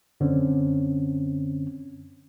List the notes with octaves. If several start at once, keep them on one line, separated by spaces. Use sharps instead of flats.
F#2 D3 C4 C#4